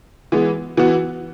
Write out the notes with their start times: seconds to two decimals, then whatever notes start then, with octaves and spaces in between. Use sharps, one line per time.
0.32 E3 G#3 B3
0.77 E3 B3 F#4